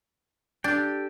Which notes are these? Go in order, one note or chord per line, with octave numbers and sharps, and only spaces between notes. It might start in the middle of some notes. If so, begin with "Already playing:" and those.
D4 G4 A4 G5